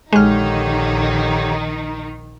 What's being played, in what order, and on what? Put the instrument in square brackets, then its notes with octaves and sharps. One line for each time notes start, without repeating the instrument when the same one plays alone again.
[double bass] A#1 [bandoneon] D3 G4 C#5 [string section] D#3 D#4 [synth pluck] G#3 F6